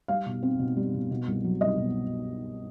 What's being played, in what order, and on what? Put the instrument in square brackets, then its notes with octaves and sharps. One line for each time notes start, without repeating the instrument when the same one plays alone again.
[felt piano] G3 F5
B2
C4
B2
G3
B2
B2
C2
F#3
C2 D#5
B2